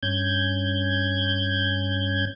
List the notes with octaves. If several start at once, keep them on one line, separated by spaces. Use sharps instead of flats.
G2 C#4 G6 G#6